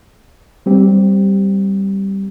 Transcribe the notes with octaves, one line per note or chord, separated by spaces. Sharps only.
G3 C4 G4